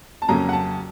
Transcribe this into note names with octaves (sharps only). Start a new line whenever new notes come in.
A5
F2 C#3 F#3 A#3 C#4 A#5
F#5
A5